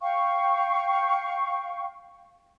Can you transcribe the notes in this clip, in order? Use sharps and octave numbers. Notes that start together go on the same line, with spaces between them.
F5 G5 C#6